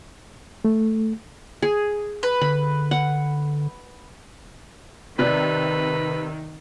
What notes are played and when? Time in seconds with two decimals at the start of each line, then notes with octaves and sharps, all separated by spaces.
0.65 A3
1.62 G#4
2.23 B4
2.41 D3 B5
2.91 F#5
5.19 C3 D#3 B4 D5 F#6